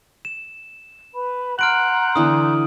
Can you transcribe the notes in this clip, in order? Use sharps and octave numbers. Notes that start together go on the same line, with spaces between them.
E7
B4 B5
F#5 A#5 C6 F6 G6 D7 F#7
D3 E3 B3 D#6